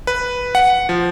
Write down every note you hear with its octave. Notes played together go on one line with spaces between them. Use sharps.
B4
F#5
F3